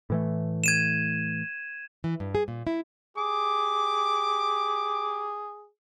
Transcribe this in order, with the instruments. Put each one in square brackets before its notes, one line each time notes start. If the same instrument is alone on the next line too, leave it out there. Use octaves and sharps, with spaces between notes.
[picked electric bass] A2 E3 A3
[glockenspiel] G#6 D#7 E7
[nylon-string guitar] E3
G2
G#4
A#2
E4
[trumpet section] G4 D6 [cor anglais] G#4